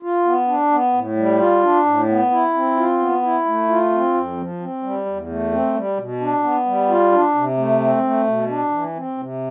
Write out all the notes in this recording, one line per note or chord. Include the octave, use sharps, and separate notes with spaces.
F4
B3
D4
B3
A2
G3
F4
D4
A2
B3
E4
C4
F4
B3
E4
A3
F4
C4
F2
F3
C4
G3
E2
A3
C4
G3
B2
D4
B3
G3
F4
D4
C3
A3
C4
A3
B2
D4
E3
C4
C3